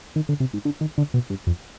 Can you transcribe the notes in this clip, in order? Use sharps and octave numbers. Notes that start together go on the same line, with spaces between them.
D#3
D3
C3
G#2
D3
D#3
D3
B2
G2
F2